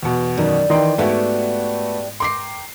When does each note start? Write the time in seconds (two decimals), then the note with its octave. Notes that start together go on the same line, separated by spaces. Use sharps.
0.03 E2 B2
0.38 F#2 D#3 G3 D#4
0.70 D#3 E3 D5 D#5 G5 C6
0.98 G#2 A3 B3 D4 E4 F#4 G4
2.20 A#4 G5 C6 D6 C7